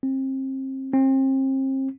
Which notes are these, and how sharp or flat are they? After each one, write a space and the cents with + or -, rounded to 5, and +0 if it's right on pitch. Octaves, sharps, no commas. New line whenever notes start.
C4 +30
C4 +35